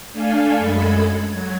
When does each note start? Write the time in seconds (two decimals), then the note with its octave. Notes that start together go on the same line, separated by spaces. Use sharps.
0.13 A3 D4 A4 F5 G#5
0.57 F#2 G#3 A4 B5 G#6
1.28 F#3 G#6